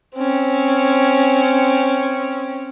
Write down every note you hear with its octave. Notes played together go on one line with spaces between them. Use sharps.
C4 C#4